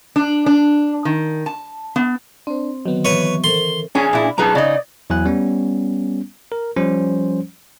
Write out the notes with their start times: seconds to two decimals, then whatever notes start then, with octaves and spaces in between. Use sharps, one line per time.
0.16 D4
0.46 D4
1.05 D#3
1.46 A5
1.96 B3
2.47 C4 D4 C5
2.86 D3 D#3 F#3 B3
3.05 E3 B4 C#5
3.22 C#6
3.44 A4 A#4 C5 C6
3.95 C#4 D4 G#4 G#5
4.13 A#2 E4
4.38 B1 D#4 G#4 B4 A5 A#5
4.55 C#3 D#4 D5 D#5
5.10 E2 F#3 E4 G#5 F#6
5.25 G3 B3 C#4
6.52 A#4
6.76 F3 G3 C#4 C5